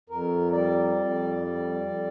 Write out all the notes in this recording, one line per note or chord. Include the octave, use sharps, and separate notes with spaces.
F2 A#4
G3 D5
F2
G3
F2